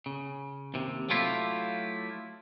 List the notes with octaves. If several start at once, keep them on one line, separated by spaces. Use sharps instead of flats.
C#3
D#2 C3
F#3 A3 E4 F4 G4